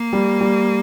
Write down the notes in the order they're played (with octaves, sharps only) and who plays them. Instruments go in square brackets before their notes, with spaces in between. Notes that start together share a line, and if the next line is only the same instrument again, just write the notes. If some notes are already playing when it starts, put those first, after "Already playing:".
Already playing: [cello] A#3
[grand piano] G3
G3